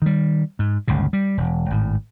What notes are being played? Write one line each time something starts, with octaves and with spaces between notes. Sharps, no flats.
D#3 G3
G#2
G1 C#2 A#2 C#3
G3
E1
G#1 A2